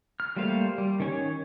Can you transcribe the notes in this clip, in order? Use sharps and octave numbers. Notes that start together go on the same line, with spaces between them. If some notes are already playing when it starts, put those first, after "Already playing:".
F6
G3 A3 A#3 C5 F5
G3
D#3 C#4 C#5